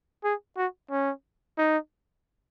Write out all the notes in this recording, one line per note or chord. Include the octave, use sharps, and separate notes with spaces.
G#4
F#4
C#4
D#4